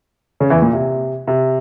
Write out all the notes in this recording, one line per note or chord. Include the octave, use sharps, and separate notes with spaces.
C#3 C#4
E2 E3
A#2
C3
C3